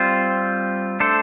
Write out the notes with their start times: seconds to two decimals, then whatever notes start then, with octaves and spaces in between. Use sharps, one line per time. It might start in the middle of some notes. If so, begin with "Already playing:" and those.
Already playing: G3 C4 F4 C5
1.00 A3 D4 A4 C5